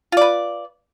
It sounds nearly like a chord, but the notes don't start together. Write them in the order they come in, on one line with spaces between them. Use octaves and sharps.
F4 D5 B4